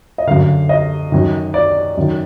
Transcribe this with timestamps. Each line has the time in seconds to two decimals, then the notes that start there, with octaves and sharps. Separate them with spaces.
0.18 D#5
0.27 F#2 D3 F5
0.69 D#5
1.12 F#2 D#3
1.54 D5
1.97 F#2 D#3